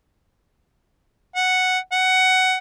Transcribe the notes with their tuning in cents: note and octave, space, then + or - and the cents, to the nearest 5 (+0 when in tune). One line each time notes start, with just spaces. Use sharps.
F#5 +0
F#5 +15